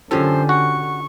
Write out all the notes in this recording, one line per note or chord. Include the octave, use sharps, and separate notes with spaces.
F#2 D3 C#4 F4 G4 A4 C5
F#4 C#6